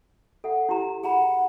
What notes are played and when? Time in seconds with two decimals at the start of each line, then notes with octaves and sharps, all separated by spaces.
0.44 A4 E5 F#5
0.69 E4 G4 A#5
1.03 G#4 F#5 A#5 B5